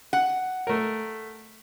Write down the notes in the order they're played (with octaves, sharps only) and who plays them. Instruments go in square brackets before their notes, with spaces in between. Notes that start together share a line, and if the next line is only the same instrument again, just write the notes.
[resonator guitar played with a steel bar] F#5
[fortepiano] A3 A#4